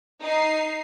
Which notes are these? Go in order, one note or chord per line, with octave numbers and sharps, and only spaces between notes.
D#4 C7